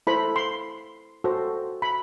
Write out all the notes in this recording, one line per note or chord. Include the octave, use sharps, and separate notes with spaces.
E4 A4 C5 B5
C6
F#4 A4 C5
B5